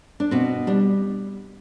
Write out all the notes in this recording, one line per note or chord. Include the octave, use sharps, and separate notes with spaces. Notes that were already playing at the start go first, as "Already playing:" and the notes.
D4
B2 C4
G3 D4